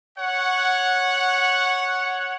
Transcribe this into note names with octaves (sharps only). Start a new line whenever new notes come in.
C#5 F#5